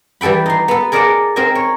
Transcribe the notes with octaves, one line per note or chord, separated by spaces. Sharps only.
E3 G3 A4 G5 B5
D#4 C6
B3 A4
G#4 A#4 D5 D#5 F#5 A5
C4 D#4 A#4 D#5 G#5
C#5